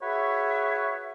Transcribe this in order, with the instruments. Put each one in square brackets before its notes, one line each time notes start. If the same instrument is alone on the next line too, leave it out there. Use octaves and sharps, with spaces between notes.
[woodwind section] F#4 G#4 B4 C#5 E5